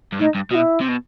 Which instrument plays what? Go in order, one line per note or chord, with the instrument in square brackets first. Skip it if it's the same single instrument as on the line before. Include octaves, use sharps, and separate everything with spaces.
[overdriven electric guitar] G2
[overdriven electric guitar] A2 [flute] D#4
[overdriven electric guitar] G2
[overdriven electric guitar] B2 [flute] E4 F#4
[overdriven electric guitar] C3
B2